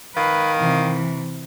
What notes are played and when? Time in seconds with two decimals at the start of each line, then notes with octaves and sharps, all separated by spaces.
0.15 D#3 B4 F5
0.58 C3 E3